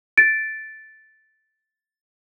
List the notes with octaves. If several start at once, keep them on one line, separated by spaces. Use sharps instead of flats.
A6 D7